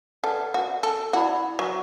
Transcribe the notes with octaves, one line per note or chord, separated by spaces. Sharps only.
A4 B4 D5 F#5 A5
F#4
A4
E4 F#4 D5 F#5 B5
F#3